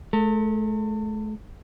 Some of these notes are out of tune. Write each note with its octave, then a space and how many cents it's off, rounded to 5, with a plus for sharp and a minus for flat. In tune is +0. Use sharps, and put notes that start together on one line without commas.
A3 -40 A4 +40